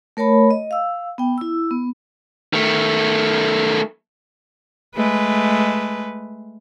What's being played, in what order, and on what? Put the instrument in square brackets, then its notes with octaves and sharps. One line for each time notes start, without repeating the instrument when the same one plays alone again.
[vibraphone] A3 A#4 C#5 A5 B5
D#5
F5 E6
B3 G5
E4 E6
B3
[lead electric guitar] D#3 A3
[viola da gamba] G#3 A3 B4